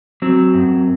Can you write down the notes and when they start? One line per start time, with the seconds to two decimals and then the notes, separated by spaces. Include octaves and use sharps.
0.22 F#3 C4
0.55 F#2